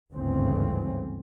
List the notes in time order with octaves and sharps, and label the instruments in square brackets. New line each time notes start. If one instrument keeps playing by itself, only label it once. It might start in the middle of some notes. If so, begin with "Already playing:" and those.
[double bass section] G1 D2 G#2 C#3 E3 C4